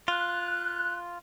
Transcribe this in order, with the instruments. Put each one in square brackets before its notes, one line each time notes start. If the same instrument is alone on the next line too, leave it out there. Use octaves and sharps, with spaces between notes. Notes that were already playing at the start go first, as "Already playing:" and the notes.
[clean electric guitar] F4 [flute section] F#6